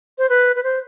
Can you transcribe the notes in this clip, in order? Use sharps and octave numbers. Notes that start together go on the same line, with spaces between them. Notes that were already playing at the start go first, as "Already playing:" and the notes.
C5
B4
B4
C5